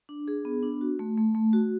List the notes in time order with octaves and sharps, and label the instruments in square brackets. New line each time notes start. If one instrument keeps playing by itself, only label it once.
[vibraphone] D4
G#4
B3
D4
F#4
A3
A3
A3
F#4